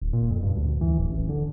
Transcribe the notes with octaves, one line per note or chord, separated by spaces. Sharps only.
D1
A#2
F2
G2
D2
E3
D1
A1
D3